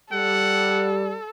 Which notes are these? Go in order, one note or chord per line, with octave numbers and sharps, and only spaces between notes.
G3 A4 F#5